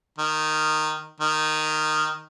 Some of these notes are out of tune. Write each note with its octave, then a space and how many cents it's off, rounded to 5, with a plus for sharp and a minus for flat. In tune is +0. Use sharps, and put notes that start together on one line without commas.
D#3 -10
D#3 -10